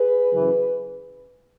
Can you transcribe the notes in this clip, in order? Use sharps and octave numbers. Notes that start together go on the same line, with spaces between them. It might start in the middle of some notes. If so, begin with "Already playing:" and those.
Already playing: G#4 B4
F#2 C#3 E3